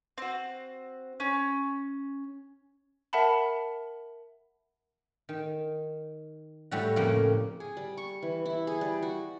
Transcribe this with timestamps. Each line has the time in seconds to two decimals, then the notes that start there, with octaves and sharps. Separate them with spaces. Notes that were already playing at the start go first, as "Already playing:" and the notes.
0.18 C4 F#4
1.20 C#4
3.13 A#4 E5 F#5 A5 B5
5.29 D#3
6.71 A2 G3 F#4
6.96 F2 A2 C#3 A#3
7.60 G#4
7.77 G3
7.98 C#6
8.22 E3
8.46 E4
8.67 G#4
8.81 G3
9.02 F#4